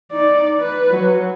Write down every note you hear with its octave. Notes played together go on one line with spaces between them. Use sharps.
D#4 D5
B4
F#3